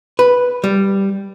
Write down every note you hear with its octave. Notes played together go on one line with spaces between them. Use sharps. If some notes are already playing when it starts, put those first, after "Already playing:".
B4
G3